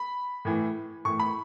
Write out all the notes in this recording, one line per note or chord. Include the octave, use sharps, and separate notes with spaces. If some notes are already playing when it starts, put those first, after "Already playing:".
Already playing: B5
A2 E3
A2 E3 C#6
B5